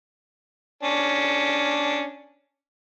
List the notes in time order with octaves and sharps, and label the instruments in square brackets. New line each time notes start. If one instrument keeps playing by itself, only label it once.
[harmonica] C#4 D4